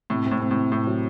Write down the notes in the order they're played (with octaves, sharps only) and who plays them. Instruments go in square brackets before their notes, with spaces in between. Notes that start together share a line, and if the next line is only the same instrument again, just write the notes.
[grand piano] A2 [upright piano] C3
[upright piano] C4
[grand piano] A2
[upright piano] C4
[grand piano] A2
[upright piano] C3
[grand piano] A2 [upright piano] C4
[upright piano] F#3